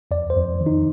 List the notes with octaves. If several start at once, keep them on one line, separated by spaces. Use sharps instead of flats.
F2 D5
C5
F2
D#3
D#4